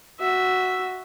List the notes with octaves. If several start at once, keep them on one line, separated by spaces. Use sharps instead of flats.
F#4 E5